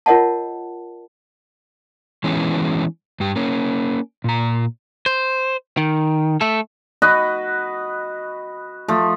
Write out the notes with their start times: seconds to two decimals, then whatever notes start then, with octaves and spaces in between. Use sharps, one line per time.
0.06 F4 A#4 C#5 D#5 F#5 A5
2.24 E3 G#3 B3 C#4
3.20 G2 G4
3.36 A#3 C#4
4.24 A#2 A#5
5.06 C5
5.77 D#3
6.41 A3 A4
7.02 F#4 B4 D#5
8.88 F3 A3